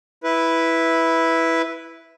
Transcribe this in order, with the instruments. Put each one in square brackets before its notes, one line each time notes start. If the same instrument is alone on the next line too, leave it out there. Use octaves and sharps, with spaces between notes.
[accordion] E4 B4